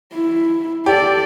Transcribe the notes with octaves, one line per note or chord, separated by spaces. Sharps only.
E4
G4 A4 D5